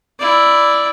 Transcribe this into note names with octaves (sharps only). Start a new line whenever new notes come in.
E4 D5